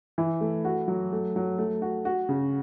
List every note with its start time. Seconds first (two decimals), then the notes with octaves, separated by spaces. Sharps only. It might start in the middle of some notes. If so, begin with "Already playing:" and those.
0.18 E3
0.41 A3
0.65 F#4
0.88 F#3
1.12 A3
1.36 F#3
1.58 A3
1.82 F#4
2.05 F#4
2.29 C#3